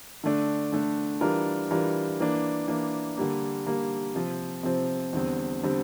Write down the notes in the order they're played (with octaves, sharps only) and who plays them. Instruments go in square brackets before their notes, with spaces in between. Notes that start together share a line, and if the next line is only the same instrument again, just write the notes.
[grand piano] D3 A3 D4
D3 A3 D4
E3 G3 D4 F4 A#4
E3 G3 D4 F4 A#4
E3 A#3 D4
E3 A#3 D4
D3 G3 A#3
D3 G3 A#3
C3 F3 C4
C3 F3 C4
E2 D3 G3 C4
D3 G3 C4